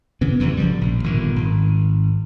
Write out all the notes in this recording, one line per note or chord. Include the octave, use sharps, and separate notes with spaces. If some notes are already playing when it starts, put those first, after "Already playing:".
C#3 E3 B3
E2 G2 E3
A1 C#3 F3 G3
A#1
G1 A#2 D#3
G#1